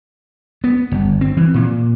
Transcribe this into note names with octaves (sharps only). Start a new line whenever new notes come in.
B3
G1
C4
E3
A#2